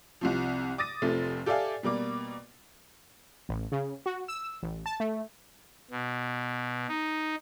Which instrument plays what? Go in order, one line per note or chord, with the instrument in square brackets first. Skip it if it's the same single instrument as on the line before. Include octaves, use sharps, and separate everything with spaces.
[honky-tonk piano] C2 C3 F3
D6 D#6 A6 A#6 D#7
F1 C3 F3 A3 C4 A6
G4 A4 D5 E5 F5 G#5
B2 G3 A#3 D6
[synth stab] A1
C#3
F#4
E6
A1
A5
A3
[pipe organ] B2
D#4